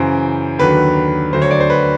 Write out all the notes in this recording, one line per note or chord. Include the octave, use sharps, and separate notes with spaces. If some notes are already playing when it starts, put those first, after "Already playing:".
Already playing: F#2 C#3 E3 C5
D#2 D3 F#3 B4
D2 D3 F#3 C5
C#5
D5
C5
B4